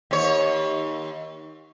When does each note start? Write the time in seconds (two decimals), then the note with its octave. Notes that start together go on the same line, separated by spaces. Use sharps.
0.11 D#2 C#5